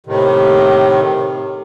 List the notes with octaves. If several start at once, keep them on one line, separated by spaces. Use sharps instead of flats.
A2 C3 D#3